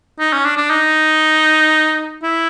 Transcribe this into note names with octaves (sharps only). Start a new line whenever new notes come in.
D#4
C#4
D4
D4
D#4
E4